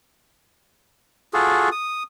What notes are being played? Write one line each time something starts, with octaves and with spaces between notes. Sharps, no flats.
F4 F#4 G#4 A4
D#6